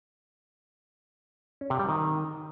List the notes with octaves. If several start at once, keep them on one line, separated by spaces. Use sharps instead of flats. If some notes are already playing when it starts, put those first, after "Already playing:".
C#4
C3
G3
D#3